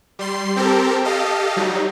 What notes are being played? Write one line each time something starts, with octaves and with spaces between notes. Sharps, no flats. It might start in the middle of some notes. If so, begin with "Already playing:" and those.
G3 C6 C7
C4 G4 A4 A#4
G4 A4 D#5 F5
F#3 G3 D#4